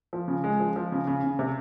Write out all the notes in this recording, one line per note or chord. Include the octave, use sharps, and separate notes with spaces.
F3
C#3
G#3
F3
F3
C#3
C#3
C#3
C3